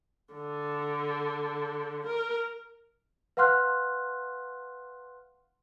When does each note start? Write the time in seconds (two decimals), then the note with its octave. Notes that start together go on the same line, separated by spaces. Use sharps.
0.35 D3
2.07 A#4
3.37 B4 F5 F#5 C6 F6 F#6